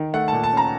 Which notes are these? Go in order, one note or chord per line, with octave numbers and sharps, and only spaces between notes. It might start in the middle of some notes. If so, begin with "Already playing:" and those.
Already playing: D#3
A3 F#5
A#2 A5
A5
C#4 A#5